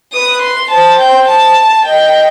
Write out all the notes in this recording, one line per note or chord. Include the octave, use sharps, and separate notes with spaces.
B4 D#6
C6
C5 A5
G5
A5
D#5 G5